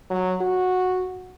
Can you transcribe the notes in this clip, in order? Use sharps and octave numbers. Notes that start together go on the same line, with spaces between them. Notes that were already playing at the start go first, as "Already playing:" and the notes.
F#3
F#4